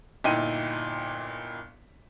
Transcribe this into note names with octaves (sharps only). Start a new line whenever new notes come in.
G1 A#2 D#4 E4 G5 D#7